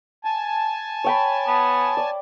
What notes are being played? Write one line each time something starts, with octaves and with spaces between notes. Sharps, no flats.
G#5 A5
C#5 G5 B5
B3
D5